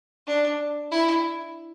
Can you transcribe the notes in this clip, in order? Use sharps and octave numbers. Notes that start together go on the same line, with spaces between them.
D4
E4